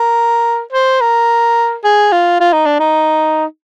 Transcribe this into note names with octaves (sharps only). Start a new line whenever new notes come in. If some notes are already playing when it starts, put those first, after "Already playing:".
Already playing: A#4
C5
A#4
G#4
F4
F4
D#4
D4
D#4